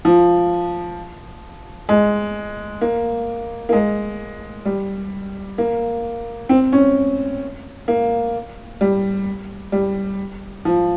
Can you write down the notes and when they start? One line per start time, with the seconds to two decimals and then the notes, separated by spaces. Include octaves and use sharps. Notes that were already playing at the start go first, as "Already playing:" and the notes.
0.05 F3
1.89 G#3
2.81 A#3
3.69 A#3
3.73 G#3
4.65 G3
5.58 A#3
6.49 C4
6.72 C#4
7.88 A#3
8.81 G3
9.72 G3
10.65 F3